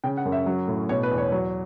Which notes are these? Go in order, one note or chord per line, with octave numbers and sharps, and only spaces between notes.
C#3 G5
F#5
F#2
E5
F#3
A2
B2 C#5
B4
E2
C#5
F#3